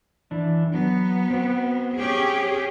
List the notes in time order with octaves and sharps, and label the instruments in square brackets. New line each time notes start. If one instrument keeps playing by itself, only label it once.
[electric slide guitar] E3 D4
[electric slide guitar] F#3 [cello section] B3
[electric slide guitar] C4 F#4
[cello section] C#4 G4 G#4